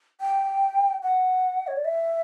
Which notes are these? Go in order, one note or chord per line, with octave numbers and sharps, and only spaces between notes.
G5
F#5
C#5
D5
E5